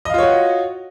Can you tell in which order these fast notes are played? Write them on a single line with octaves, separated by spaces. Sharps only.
D#5 F5 F4 C#5 F#4